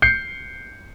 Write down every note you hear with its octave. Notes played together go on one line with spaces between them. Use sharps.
G6 C7 C#7